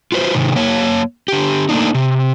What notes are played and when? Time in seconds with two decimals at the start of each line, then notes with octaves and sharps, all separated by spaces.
0.12 F4 F#4 B4 C5
0.35 G#2 C3 D#3
0.55 F#2 A#3 C#5
1.28 D3 G4
1.69 A3 A#3 D4 D#4
1.94 C3